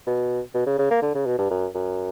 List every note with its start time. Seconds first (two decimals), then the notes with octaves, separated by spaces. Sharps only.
0.07 B2
0.54 B2
0.66 C#3
0.79 C#3
0.91 A#3
1.02 D3
1.15 C#3
1.26 B2
1.38 G2
1.50 F#2
1.75 F#2